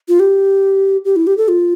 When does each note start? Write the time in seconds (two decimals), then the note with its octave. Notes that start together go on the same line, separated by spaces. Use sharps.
0.08 F4
0.20 G4
1.05 G4
1.16 E4
1.27 G4
1.37 A4
1.48 F4